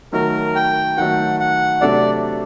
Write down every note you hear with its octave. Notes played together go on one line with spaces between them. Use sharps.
D#3 F#3 A3 A#4
G5
D#3 F#3 A3 F#5
F#5
C3 F#3 A3 D4 A4 D5